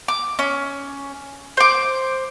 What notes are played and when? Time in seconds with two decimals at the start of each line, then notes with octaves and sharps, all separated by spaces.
0.08 D6
0.39 C#4
1.57 C5 D6